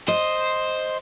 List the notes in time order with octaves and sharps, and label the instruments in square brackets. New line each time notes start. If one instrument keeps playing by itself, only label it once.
[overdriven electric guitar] C5 [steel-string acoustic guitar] D#5